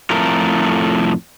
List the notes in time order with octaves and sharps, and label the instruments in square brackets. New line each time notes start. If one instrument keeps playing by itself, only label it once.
[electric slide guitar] F2 A2 A3 A#4